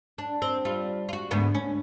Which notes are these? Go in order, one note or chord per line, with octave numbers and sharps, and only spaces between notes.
D4
C4
G3 F4
F4 F#4
D2 G#2 B3
C#4